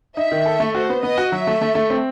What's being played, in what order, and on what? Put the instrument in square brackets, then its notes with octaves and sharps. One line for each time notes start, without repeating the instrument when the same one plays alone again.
[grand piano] D#4 [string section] E5
[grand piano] D#3
A4
A3
[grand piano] F#4 [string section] C5
[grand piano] B3
[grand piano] B3 [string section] D#5
[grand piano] F#4
[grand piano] F#3 [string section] E5
[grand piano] A3
A3
A3
C4